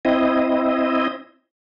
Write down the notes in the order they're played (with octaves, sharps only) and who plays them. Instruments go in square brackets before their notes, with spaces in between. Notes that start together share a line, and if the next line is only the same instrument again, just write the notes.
[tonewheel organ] C4 E4 D#5